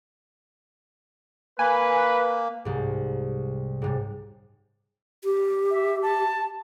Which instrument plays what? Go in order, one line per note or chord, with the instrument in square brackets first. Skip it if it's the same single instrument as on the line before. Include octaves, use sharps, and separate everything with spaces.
[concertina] A#3 [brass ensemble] B4 [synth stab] G#5
[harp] C2 G#2
G#2 C3 G3
[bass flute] G4
[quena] E5
A5